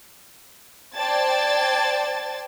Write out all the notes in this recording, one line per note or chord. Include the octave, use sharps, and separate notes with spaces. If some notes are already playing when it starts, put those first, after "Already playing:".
C5 D5 G5 A5 G#6 A6